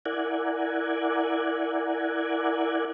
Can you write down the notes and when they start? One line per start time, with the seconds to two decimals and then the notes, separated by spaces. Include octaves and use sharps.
0.06 E4 A#4 D5 F#5 G#5